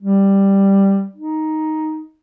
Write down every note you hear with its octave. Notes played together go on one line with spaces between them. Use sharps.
G3
D#4